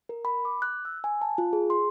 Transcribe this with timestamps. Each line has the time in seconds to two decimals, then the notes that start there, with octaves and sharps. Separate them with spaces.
0.09 A#4
0.25 B5
0.45 D6
0.62 F#6
0.85 E6
1.04 G#5
1.22 A5
1.38 F4
1.53 G#4
1.70 C6